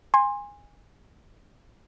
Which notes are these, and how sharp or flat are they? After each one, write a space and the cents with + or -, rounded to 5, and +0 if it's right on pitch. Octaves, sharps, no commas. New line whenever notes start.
G#5 -20 C6 +15